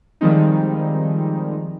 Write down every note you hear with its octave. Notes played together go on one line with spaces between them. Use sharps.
D#3 F3 G3 G#3 C4 D#4